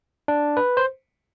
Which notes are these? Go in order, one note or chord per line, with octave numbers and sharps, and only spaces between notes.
D4
B4
C5